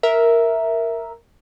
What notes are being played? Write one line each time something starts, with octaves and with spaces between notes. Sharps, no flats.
A#4 E5